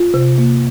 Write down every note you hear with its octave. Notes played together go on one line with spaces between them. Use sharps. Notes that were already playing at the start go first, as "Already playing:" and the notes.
Already playing: F4
C3
A#3